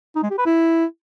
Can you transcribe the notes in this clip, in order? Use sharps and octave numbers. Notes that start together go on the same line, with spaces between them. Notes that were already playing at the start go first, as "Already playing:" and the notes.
D#4
G#3
G4
B4
E4